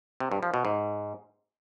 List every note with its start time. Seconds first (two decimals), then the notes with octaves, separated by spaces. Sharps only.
0.20 C3
0.32 G2
0.43 F3
0.54 B2
0.65 G#2